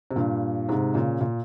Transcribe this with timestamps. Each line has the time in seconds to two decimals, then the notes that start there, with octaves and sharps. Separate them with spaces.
0.11 C3
0.16 G2 A#2
0.69 G#2 C3
0.94 A#2 C#3
1.21 A#2